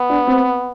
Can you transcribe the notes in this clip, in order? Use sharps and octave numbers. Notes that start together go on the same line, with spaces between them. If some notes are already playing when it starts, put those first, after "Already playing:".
Already playing: B3
D4
C4